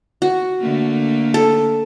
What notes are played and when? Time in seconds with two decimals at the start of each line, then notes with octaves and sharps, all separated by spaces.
0.22 F#4
0.59 D3 A3 A#3
1.34 A4